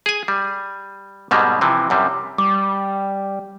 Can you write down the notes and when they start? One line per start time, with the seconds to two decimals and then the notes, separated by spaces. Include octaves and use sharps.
0.06 G#4 G#5
0.28 G3
1.31 G#2 B2 G3 G#3 A#3
1.61 C3 E3 F3
1.90 F#2 C3 G3
2.38 G3 D6